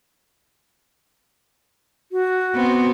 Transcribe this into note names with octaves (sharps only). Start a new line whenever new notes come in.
F#4
B3 C4